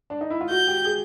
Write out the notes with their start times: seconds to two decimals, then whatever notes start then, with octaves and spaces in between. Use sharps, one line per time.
0.10 D4
0.21 D#4
0.30 E4
0.41 F4
0.50 F#4 G6
0.68 G4
0.85 G#4